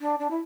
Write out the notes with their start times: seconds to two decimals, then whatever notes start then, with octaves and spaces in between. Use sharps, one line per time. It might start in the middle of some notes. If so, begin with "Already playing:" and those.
0.01 D4
0.20 D4
0.30 E4